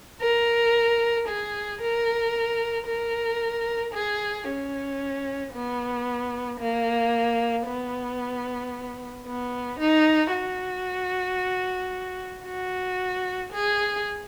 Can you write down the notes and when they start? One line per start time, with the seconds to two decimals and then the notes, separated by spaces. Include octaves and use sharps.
0.21 A#4
1.28 G#4
1.82 A#4
2.87 A#4
3.94 G#4
4.48 C#4
5.53 B3
6.60 A#3
7.67 B3
9.26 B3
9.79 D#4
10.33 F#4
12.45 F#4
13.52 G#4